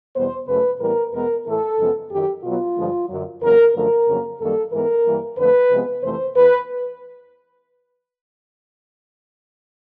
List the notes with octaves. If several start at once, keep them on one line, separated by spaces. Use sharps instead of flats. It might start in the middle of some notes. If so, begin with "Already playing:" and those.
E2 B2 G3 B3 C5
F#2 C#3 F#3 A3 B4
A2 E3 G3 B3 A#4
E2 B2 G#3 B3 A#4
A2 E3 A3 A4
F#2 C#3 F3 G#3 B3
F#2 D#3 F#3 G4
B2 F#3 B3 F4
G2 D3 F3 G#3
F#2 D3 F#3
E2 C#3 F#3 A#3 A#4
F#2 D3 F3 A3 A#4
F2 C#3 F#3 A#3
F#2 D#3 G3 A#3 A4
G#2 E3 G#3 B3 A#4
G2 E3 G3 A#3
F2 D3 F3 A3 B4
C3 F3 G#3 B3
F2 C3 E3 A3 C5
E2 B4